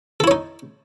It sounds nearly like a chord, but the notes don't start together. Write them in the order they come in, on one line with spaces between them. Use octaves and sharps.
A4 E4 C#5 D#4